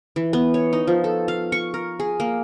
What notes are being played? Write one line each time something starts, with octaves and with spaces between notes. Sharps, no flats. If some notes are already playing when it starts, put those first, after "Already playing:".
E3
B3
C#5
D#4
F3
A4
F5
C#6
A#4
G#4
A#3